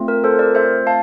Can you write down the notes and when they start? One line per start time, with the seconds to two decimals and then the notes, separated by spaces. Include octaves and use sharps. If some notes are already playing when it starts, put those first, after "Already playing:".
Already playing: A3 C4 F4
0.08 A#4
0.24 A4 C5
0.39 A#4 D5
0.55 C5 E5
0.87 F5 A5